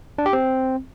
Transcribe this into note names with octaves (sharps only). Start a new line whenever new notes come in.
D4
G4
C4